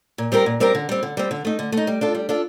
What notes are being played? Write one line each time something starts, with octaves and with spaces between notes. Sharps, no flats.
A#2
G3 C4 G4 A#4
A#2
G3 C4 G4 A#4
D3
G3 C4
D3
G3 C4
D3
A3 D#4
D3
A3 D#4
G3
D4 F4 A4
G3
D4 F4 A4